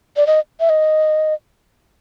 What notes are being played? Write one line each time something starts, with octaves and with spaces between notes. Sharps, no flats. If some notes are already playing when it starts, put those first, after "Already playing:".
D5
D#5
E5
D#5